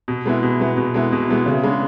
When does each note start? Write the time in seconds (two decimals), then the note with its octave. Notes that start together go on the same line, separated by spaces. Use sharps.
0.08 B2
0.25 G#3 B3 E4
0.43 B2
0.60 G#3 B3 E4
0.77 B2
0.94 G#3 B3 E4
1.12 B2
1.29 G#3 B3 E4
1.46 C#3
1.63 G#3 B3 D4